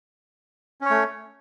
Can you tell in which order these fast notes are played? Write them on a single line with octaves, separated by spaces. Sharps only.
C#4 C#5 A3